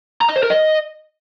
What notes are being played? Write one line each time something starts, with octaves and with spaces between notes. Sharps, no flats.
A#5
D#5
C5
A#4
D#5